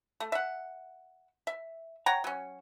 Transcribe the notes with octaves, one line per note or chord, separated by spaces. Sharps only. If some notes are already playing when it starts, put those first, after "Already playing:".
A3
E5 F#5
E5
C#5 F#5 G5 A#5
F#3 C#4